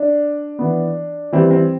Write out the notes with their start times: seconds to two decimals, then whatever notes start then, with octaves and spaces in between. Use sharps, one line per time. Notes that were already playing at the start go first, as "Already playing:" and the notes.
Already playing: D4
0.59 E3 B3
1.33 E3 G3 C4
1.51 C4